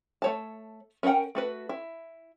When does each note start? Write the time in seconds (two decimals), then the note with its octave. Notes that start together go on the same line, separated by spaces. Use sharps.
0.22 A3 C#5 A5
1.03 C#4 A#4 D#5 F#5 G5
1.35 A3 F#4 B4
1.69 E4